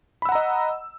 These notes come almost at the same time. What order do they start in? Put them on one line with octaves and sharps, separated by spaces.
B5 E6 F#5 A#5 D#5